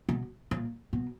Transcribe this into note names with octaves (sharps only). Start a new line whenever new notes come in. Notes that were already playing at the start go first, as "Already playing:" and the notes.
B2
A#2
B2